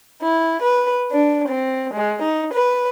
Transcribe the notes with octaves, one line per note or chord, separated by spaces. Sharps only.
E4
B4
D4
C4
G#3
D#4
B4